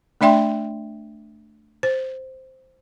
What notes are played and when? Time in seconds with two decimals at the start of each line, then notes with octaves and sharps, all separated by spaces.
0.21 A3 D4 D5 E5 G5 C6
1.83 C5